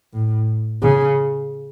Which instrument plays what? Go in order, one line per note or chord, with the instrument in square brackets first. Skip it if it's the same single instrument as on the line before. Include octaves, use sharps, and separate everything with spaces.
[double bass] A2
C#3